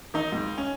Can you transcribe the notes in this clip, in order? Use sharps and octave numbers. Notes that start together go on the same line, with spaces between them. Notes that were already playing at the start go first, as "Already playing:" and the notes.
D#3 D#4
C#2
C#4